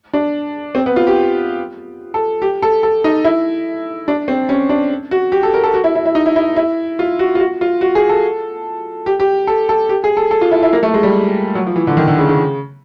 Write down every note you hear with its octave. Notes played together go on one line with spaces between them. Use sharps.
D4
C4
B3
F4
G4
A4
G4
A4
A4
D#4
E4
D4
C4
C#4
D4
F#4
G4
A4
A#4
A4
F#4
E4
E4
E4
D#4
E4
E4
E4
F4
F#4
F4
F#4
F4
F#4
G#4
A4
G4
G4
A4
A4
G4
G#4
A4
A4
F4
E4
E4
A#3
A3
G#3
G3
F#3
F3
E3
D3
D#3
D3
C#3
C#3